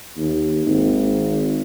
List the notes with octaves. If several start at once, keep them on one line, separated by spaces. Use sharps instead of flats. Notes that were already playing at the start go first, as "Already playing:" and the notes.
D#2
G#1